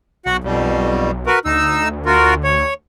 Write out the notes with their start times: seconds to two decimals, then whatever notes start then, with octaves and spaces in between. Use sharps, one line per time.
0.26 B1 F#4 F#5
0.44 B1 F2 B2 G3
1.27 F#4 A#4 B4
1.45 D2 D#4 E6
2.06 F4 F#4 A#4
2.44 C#5